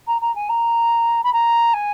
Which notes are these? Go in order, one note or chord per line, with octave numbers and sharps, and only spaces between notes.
A#5
A#5
G#5
A#5
B5
A#5
G#5